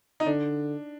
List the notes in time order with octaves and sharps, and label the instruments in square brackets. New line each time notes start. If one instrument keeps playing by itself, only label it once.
[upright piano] D#4
[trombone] D3 [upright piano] D4